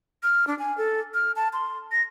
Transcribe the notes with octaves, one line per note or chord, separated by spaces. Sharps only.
F6
D4
G#5
A4
F6
A5
C6
A#6